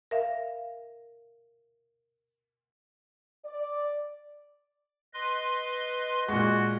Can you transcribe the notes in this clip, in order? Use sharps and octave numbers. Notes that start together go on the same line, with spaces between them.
A#4 E5 F5
D5
B4 D#5 C6
A#2 G#3 F#4